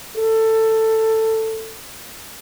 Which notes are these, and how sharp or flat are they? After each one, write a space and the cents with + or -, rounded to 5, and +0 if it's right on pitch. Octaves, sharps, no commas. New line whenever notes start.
A4 +15